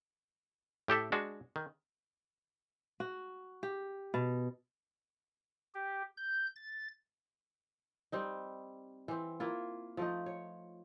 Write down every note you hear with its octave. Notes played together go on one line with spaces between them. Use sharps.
A2 G4 A4 E5
G#3 D4 F#4
D#3
F#4
G4
B2
G4
G6
A6
G3 C4 D#4
E3 C4
A#3 E4 F4
F3 A3 D#4
C#5